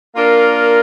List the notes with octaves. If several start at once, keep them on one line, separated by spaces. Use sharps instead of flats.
A#3 D4 F4 A#4